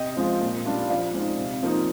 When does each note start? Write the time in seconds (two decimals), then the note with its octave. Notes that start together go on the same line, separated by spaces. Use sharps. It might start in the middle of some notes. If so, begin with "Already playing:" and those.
Already playing: C3 D#5 G5
0.17 F3 G#3 C4 F4
0.41 A#2
0.65 G3 D4 F4
0.89 F3 D5 F5
1.14 G#3 C4 D#4
1.38 C3
1.63 F3 A#3 D#4